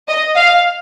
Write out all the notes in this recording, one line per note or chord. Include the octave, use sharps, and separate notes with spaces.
D#5
F5